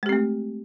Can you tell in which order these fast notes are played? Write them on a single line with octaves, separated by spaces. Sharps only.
G#3 G4 C4 A3